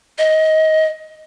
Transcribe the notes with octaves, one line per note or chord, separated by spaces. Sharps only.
D#5